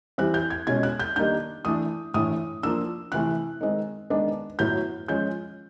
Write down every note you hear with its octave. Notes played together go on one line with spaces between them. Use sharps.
E3 G3 C4 F#6
G6
G#6
B2 G#3 C#4 G#6
F#6
G6
D#3 G3 A#3 D4 G6
E3 A3 D4 D#6
A2 E3 A3 D4 D#6
F3 A#3 D4 E6
C3 E3 A3 F#6
D#3 G#3 C4
D#3 G#3 B3 D4
A2 F#3 B3 G6
F3 G#3 C#4 G6